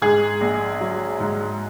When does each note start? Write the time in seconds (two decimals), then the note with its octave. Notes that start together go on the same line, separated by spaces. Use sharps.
0.02 G#2 G#4
0.41 A#1
0.81 F#3
1.20 G#2